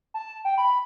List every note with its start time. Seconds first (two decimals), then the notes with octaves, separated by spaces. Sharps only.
0.14 A5
0.45 G5
0.58 B5